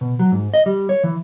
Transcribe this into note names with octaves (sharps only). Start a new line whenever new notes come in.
B2
F#3
G#2
D#5
G3
C#5
E3